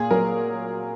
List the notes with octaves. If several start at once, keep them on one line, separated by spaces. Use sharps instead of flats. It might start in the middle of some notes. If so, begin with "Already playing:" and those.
Already playing: A#2 G#4
F#3 A#4